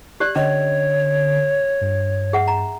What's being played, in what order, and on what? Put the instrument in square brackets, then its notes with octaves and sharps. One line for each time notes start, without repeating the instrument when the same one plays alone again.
[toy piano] G4 D5 [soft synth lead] F#6
[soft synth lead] D3 [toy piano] C#4 D#5 [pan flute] C#5
[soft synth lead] G2
[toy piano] G#4 E5 F#5
A#5